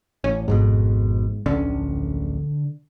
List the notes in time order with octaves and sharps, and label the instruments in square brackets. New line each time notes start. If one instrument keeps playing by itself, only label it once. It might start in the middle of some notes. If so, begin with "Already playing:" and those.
[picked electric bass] A1 [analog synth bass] C#4
[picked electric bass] G#1 F2 B2 [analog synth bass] G#2
[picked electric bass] D1 A#1 C#4 [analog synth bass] D3